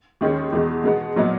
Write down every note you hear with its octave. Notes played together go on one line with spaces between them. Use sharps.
D#2 D#3 G#3 C#4
E2 B2 G#3
B2 G#3 B3
A#2 F#3 B3 D#4